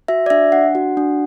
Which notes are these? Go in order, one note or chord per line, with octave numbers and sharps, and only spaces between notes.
F#4 E5
D5
D4 E5
D4 F#5
F#4
D4